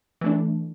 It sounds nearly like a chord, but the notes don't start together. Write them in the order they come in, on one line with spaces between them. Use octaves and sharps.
E3 A3 D4